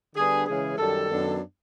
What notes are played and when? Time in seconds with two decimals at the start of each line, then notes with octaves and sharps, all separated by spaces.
0.15 D3 G3 B3 D4 G#4
0.46 C#3 E3 G#3 C#4 G#4
0.77 F#2 D#3 G3 A4
1.09 F#2 D#3 F#3 B3 D4